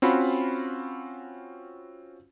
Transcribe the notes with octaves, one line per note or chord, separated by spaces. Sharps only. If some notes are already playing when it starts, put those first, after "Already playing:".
C4 C#4 F4 F#4 B5